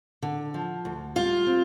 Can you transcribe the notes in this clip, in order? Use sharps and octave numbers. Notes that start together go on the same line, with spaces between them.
D3
F3
D2
G3 F4
C4